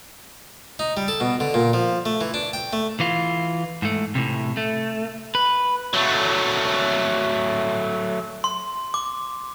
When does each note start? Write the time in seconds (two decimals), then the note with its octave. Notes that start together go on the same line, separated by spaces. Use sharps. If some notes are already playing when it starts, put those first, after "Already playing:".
0.79 D#4
0.97 G3
1.08 A4
1.20 B2
1.40 D3
1.54 A#2
1.73 F3
2.06 A3
2.21 E3
2.34 D4
2.53 G5
2.73 A3
3.00 E3 F4
3.82 G#2 A3
4.15 A2 C3
4.57 A3
5.35 B4
5.93 F#3 A3
8.44 C6
8.94 D6